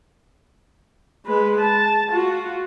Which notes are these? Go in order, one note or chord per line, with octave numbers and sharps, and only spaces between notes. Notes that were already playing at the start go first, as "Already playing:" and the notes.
G#3 B4
A5
F4 F#4